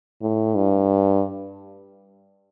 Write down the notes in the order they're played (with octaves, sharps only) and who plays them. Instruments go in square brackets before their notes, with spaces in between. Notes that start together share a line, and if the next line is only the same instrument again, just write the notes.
[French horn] A2
G2